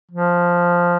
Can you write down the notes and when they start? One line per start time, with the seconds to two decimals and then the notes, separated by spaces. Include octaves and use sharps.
0.11 F3